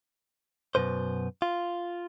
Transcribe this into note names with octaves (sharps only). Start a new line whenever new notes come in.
F#2 B2 B4 C5
F4